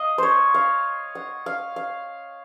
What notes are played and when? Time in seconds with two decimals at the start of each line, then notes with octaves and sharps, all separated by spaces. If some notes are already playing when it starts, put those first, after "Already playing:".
Already playing: D#5 F5
0.18 C5 C#5
0.54 F5
1.15 F#5
1.46 F5
1.76 F5